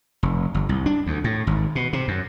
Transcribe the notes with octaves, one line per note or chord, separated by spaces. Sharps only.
F1
G1
C2
D4
D2
A2
G#1
B2
C3
F#2